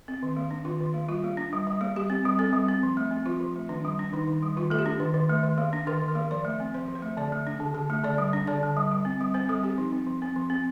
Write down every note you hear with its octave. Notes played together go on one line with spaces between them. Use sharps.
C4
D#3
A#3
D4
D#3 F4
D#3
A#3
G3 F4
A#3
D4
G3
G3
A#3
G3 G4
C4
G3
C4 A4
G3
C4
F3
A3
C4
F3 F4
F3
A3
D#3 D4
G3
D4
D#3 D#4
D#3
G3
D#3 F4
A3 A4
G4
D4
D#3
D#3
A3
D#3
A#3
D4
D#3 A#4
D#3
A#4
A#3
F3 D5
A3
C4
F3 C5
F3
C5
A3
D3 D5
A3
D4
D3
D3
A3
D3 D5
G3
D4
D3 D5
D3
G3
G3
C4
G3
C4 C5
G3 A4
C4 G4
F3 D#4
C4
F3
C4
F3
C4